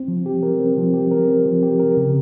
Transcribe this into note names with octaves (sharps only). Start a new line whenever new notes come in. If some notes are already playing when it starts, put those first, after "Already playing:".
Already playing: C4
F3
G4
A#4
C4
F3
G4
A#4
C4
F3
G4
A#4
C#3